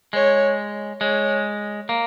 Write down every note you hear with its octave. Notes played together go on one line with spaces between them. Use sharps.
G#3 C#5
G#3 C#5
A#3